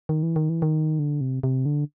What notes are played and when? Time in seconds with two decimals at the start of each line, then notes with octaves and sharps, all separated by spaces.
0.09 D#3
0.23 E3
0.36 D#3
0.49 E3
0.62 D#3
0.99 D3
1.21 C3
1.43 C3
1.66 D3